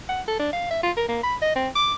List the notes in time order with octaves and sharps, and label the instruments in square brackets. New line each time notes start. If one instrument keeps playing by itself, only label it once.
[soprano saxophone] F#5
A4
D4
F5
E5
F4
A#4
A#3
B5
D#5
C4
D6